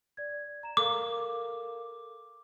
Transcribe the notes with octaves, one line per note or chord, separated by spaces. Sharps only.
D5 G#6
A#5 E7
A4 A#4 F5 D6